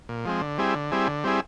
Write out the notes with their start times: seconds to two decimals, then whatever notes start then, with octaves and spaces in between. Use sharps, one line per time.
0.09 A#2
0.25 F3 G#3 C4
0.41 D3
0.58 G3 C4 E4 G#4
0.75 D3
0.91 G3 C4 E4 G#4
1.08 D3
1.24 G3 C4 E4 G#4